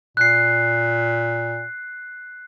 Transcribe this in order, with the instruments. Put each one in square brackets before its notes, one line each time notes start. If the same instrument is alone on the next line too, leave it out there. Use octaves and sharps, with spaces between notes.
[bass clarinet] A#2 [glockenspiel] F#6 C7